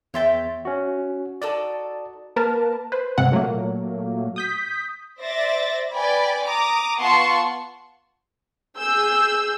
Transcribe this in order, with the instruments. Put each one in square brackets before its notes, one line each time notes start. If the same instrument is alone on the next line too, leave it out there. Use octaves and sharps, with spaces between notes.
[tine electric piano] E2 C6 A6 [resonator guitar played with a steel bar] C#5 E5 G5
[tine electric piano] C#4 F#4
[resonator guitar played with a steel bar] D#4 F#4 A4 [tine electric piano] D5 A5
[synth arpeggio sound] A#3 A#4 B4 A5
B4 C5
G2 C3 G#3 C4 F#5
A#2 F#3 A3 A#3
D#6 G6 B6
[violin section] C5 D5 E5 A6 A#6
B4 D5 G5 G#5 B5
A#5 D6 D#6
B3 F4 F#5 A5 C6 C#6
G#4 E6 G6